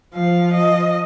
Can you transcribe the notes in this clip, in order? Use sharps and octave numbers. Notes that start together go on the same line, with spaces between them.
F3 F5
D#5